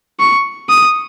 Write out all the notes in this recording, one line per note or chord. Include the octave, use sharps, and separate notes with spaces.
C#6
D#6